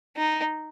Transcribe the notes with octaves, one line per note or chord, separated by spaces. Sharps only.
D#4